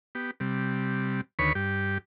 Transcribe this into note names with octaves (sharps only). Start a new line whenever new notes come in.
B3 G4
C3 G3
D2 D#3 B4 C#5 B5 C#6
G2 G4